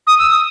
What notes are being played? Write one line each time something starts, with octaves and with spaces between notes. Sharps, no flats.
D#6
E6
D#6